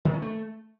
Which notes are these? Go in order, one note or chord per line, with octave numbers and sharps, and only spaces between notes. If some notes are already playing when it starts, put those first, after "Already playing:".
D#3
C#4
A3